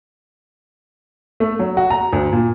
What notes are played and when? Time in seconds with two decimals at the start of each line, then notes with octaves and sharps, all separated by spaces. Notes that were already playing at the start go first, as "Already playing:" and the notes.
1.40 A3
1.59 F#3
1.77 F#4
1.90 A#5
2.13 D2
2.32 A#2